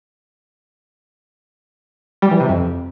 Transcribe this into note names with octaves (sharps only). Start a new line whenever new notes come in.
G3
E3
C3
F2